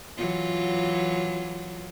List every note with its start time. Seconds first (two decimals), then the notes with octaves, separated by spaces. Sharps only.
0.17 E3 F#3 F4